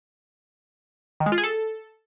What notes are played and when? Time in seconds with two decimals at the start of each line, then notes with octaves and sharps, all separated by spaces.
1.20 D#3
1.26 G#3
1.32 F4
1.38 G#4
1.44 A4